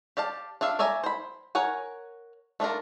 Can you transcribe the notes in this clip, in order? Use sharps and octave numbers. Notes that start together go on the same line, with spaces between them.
G4 D5 F5 A5
D4 F4 E5 F5
C#5 D5 E5 G#5 A#5
C5 B5
A#4 C#5 F#5 G#5
A3 D4 F4 A#4